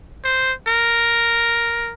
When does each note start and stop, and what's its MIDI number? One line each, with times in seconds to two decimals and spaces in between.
0.24 0.53 72
0.67 1.93 70